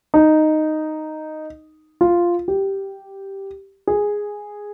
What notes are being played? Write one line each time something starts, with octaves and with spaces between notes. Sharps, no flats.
D#4
F4
G4
G#4